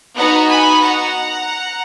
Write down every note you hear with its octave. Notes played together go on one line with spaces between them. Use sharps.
B3 D#4 F#4 F#5 A#5
G#5 B5
F#5 A#5